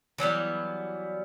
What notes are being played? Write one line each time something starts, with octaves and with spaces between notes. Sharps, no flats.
E3 F#3 G3 B3